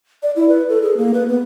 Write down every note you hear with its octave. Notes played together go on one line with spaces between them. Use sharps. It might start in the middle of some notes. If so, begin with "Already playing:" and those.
D5
E4
B4
A4
G#4
A#3
B4
B3